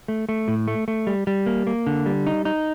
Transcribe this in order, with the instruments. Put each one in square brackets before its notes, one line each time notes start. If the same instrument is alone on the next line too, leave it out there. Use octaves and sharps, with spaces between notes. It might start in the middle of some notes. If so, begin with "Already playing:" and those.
[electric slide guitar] A3
A3
A2
A3
A3
G3
G3
A#3
A#3
D3
G3
D#4
D#4